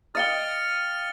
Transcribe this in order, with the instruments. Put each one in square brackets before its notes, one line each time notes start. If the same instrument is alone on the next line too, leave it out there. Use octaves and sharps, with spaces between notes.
[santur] D#5 F5 G5 [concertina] F6 [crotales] A6 C#7 G7